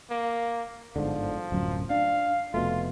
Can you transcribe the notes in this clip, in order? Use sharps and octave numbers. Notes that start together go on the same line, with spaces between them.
A#3
G1 G#2 D3 F3
D1 F#2
D4 F5
F1 B2 A3 F4